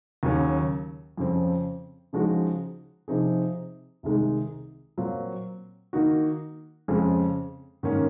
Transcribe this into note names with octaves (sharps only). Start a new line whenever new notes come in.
D#2 C#3 F#3 C#4
F2 C#3 F3 C4
C#3 F3 G#3 D#4 F#4
C3 F3 C4 D#4 G#4
C2 C3 D#3 G#3 D#4
A#2 F#3 C4 F4
D#3 A#3 D#4 F#4
F2 C#3 G#3 C4
G#2 D#3 A#3 C#4